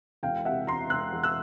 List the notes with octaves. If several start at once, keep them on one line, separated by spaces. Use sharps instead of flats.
E1 F5 G5
C3 E5 F#5
E1 A#5 C6
E1 E6 F#6
E2
E6 F#6